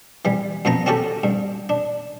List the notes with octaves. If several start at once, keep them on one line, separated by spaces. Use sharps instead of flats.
E3 G3
F#2 F3 B3 A#5
C4 C#4 F#4 G4 A4
G2
D4